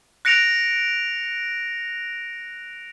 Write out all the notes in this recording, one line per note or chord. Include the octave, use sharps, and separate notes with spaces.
F#6 A#6 C#7 D7 F7